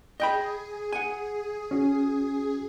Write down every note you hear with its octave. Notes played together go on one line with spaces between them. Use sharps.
G#4 D#5 G5 B5
F#5 G#5
C#4 F#4